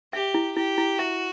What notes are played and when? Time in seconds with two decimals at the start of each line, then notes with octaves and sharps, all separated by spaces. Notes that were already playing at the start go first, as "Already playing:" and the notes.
0.13 G4 E5
0.34 E4
0.56 E4 G4
0.78 E4
0.99 F#4 E5